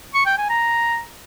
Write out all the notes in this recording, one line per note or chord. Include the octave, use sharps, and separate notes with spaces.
C#6
G5
G#5
A#5